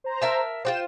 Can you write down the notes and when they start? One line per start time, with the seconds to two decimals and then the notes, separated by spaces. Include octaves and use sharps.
0.04 C5 A#5
0.22 A#4 E5 A5
0.65 F4 F#4 C5 G5 E7